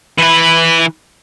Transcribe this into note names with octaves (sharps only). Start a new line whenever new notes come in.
E3 B4